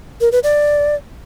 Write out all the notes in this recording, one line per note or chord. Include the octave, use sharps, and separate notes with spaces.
A#4
B4
D5